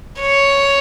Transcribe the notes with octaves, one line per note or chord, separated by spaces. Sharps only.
C#5